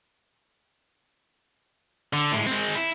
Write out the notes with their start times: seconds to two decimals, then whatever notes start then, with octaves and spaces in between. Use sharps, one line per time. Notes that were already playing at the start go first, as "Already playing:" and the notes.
2.13 D3
2.32 A2 G#3
2.47 G#3 C4
2.76 E4